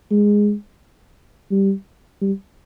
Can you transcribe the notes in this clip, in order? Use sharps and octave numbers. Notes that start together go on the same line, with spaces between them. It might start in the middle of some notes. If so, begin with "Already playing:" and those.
G#3
G3
G3